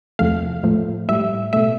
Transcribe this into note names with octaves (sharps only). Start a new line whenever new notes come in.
E2 C3 F3 A3 F5
A2 F3 A3
A2 G3 E5
B2 A3 E5